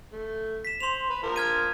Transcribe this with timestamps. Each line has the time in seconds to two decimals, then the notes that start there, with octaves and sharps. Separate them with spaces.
0.12 A3
0.65 B6 E7
0.80 C5 C6 F7
1.10 B4
1.23 F3 A#4
1.36 F6 G#6 D#7